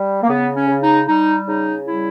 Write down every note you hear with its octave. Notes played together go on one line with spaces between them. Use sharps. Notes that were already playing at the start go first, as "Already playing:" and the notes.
Already playing: G3
A#3
C#3 B3
C#4
C#3
D#4
G3 D#4
C#3 D#4
G3 E4